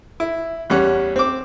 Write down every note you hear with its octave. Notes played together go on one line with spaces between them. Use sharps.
E4
E2 G3 C#4 F#5
C4 D6